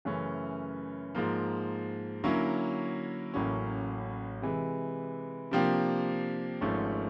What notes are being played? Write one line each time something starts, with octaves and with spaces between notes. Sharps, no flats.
F#2 C#3 E3 A3 C#4
G#2 F3 A#3
D3 F#3 A#3 C#4 E4
A1 A2 F#3 A#3 C#4
C3 E3 G#3
C3 F3 A#3 D4 G4
G#1 G#2 F3 A3 C#4